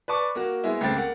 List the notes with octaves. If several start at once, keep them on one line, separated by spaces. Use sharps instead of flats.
B4 D5 A5 C#6 D6
A#3 F#4
G#3 B3 E4
C#2 A3 C4 G5 A6
A#3 F#5